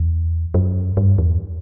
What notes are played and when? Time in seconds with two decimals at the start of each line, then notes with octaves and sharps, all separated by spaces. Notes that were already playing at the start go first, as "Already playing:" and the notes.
Already playing: E2
0.54 F#2
0.97 G2
1.18 E2